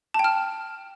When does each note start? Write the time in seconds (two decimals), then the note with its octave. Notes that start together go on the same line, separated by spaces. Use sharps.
0.14 A5
0.19 G5
0.24 F6